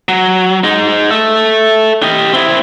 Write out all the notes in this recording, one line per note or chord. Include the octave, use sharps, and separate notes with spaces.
F#3
G#3 D#4
A4 E5
G4 D#5
C4 E4